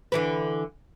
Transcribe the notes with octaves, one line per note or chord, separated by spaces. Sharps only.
D3 E3 B4